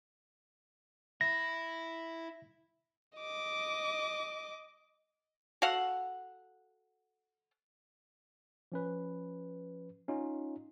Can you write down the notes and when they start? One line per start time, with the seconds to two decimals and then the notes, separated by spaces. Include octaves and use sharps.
1.21 E4 A#6
3.18 D#5 D6
5.62 F#4 A4 F5 F#5
8.72 F3 C#4 B4
10.08 C#4 D#4 F4